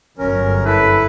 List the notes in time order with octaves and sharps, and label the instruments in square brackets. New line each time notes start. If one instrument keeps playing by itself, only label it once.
[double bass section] G1 F#2 [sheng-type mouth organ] C#4 A#4
[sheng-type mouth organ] E4 A4 [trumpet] B4